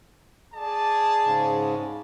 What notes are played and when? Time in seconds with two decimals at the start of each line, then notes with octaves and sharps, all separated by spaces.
0.54 G#4 D5 A5
1.25 G#2 C#3